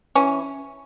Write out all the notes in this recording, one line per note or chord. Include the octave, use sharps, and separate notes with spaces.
E3 C#4